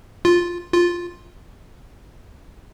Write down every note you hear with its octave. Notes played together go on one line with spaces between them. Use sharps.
F4
F4